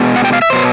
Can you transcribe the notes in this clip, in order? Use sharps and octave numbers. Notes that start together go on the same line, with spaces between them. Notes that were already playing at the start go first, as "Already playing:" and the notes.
Already playing: B2 G#3
F#5
G5
F5
E5
B2 F#3 C5